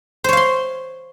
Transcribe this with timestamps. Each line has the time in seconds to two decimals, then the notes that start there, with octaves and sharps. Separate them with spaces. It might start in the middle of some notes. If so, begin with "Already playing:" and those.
0.24 C5
0.29 C#5
0.33 F5
0.37 C6